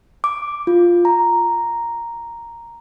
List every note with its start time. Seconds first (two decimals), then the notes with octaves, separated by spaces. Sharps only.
0.24 D6
0.67 F4
1.05 A#5